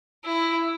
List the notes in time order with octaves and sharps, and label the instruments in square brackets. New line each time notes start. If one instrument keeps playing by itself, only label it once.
[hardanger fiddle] E4 [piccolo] E6